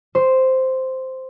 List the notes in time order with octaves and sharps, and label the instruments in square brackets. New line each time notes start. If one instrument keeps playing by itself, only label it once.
[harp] C5